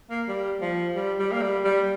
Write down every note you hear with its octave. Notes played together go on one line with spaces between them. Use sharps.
A#3
G3
F3
G3
G3
A#3
G3
G3